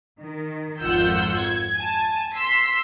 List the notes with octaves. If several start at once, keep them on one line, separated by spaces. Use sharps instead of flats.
D#3
G#1 F2 F4 F#5 E6 G6
G#6
G#5 A5
C6 E6 B6 C7